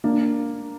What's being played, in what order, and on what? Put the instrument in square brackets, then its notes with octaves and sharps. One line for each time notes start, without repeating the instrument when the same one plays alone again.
[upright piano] A#3 D4